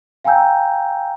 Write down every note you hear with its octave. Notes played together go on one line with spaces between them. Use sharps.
F5 G5 G#5 A#5 E6 G6